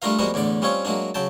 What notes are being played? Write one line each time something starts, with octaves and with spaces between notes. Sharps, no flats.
G3 A3 D4 F4 A#4 F5
F3 G3 G#3 A#3 B3 F#4
E2 A2 D3 D5
G3 C4 C#4 F4 C#5
F#3 G#3 A#3 D4
C#3 F#3 G5 A5